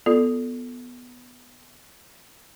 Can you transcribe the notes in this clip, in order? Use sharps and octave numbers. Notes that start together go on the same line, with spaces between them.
B3 F4 A4 D5